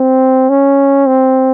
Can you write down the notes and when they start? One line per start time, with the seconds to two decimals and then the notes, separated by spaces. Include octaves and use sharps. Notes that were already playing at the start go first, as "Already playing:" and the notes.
Already playing: C4
0.50 C#4
1.07 C4